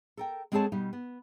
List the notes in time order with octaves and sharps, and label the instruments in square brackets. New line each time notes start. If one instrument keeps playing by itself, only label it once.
[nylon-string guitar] A4 A#4 G5
G#3 C4 G#4 A4 C#5 A5
B2 G3 D#4
B3